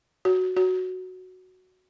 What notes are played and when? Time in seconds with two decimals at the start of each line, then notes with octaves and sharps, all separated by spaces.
0.25 F#4
0.57 F#4